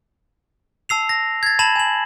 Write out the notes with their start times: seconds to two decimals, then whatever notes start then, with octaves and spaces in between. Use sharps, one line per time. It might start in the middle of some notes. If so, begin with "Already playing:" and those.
0.89 A5 E6 C7 F7
1.09 A#6
1.43 G#6 A6
1.59 A5 B5 E7 F#7
1.76 G#5 F#7